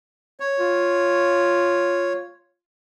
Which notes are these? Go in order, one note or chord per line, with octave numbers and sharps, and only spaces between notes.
C#5
F4